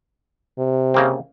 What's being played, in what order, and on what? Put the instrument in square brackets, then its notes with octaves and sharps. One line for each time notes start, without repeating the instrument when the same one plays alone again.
[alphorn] C3
[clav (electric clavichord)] C#3 A#3 C4